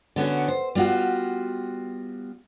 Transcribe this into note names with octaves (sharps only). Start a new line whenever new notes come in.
D3 B3 C#4 F#4
C5
G3 B3 F4 F#4